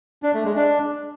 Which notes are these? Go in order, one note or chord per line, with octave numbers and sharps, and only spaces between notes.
D4
A3
G#3
D4